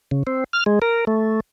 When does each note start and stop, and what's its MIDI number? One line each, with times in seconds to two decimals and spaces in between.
0.11 0.23 49
0.27 0.44 60
0.53 0.64 89
0.66 0.79 56
0.82 1.05 70
1.07 1.40 57